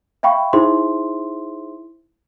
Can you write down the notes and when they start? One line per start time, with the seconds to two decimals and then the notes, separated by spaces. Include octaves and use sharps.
0.23 E5 F5 G5 B5 C#6
0.53 D#4 E4 G#4 C5 E5 C6